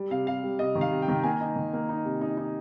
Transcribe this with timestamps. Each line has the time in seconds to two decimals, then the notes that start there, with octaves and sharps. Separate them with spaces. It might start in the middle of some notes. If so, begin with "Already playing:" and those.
Already playing: G3
0.10 C3 F5
0.27 C3 F5
0.43 G3
0.59 C3 D#5
0.75 D#3
0.81 F5
0.91 C3
1.02 G5
1.08 D#3
1.23 A#3 G#5
1.40 D#4
1.56 D#3
1.73 A#3
1.89 D#4
2.05 C3
2.21 D#4
2.37 D#4